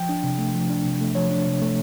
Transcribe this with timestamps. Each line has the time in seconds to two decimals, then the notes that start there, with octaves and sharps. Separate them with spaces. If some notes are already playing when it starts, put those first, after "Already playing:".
Already playing: F3 G5
0.09 D4
0.23 C3
0.38 A3
0.54 F3
0.70 D4
0.85 C3
1.01 A3
1.15 F3 C#5
1.31 D4
1.46 C3
1.61 A3